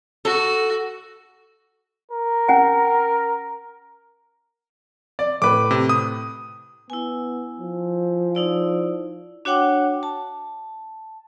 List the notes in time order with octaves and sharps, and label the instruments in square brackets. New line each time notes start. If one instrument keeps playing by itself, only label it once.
[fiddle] F#4 [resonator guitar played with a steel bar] A4
[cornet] A#4
[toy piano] C#4 F#5 G#5
[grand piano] D5
[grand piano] A2 B4 [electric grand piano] D6
[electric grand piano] C3
D#6
[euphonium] B3 [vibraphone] E4 G#5
[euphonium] F3
[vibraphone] D#4 E4 D5
D4 F#4 C#5 F#5 G5 D6
A5